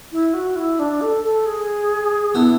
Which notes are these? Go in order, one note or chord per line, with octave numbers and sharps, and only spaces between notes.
E4
F#4
E4
D4
A4
A4
G#4
B3 D4 E4